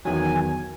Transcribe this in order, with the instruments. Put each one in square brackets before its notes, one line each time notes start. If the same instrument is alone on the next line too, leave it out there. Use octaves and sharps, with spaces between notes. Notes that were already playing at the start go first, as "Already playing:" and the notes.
[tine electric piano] E2 D#3 F#3 [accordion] G#5